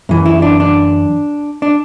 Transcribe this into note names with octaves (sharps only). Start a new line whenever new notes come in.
F#2 E3
E4
D4
D4
D4